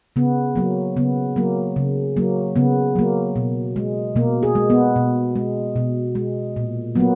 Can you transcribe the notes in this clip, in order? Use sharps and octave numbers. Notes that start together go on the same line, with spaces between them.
C#3 B3
F#3 A#3
C#3 B3
F#3 A#3
C#3
F#3 A#3
C#3 B3
F#3 A#3
B2
G#3
B2 A#3
G#4
G#3
B3
B2
G#3
B2
G#3
A#2
F#3 A#3 B3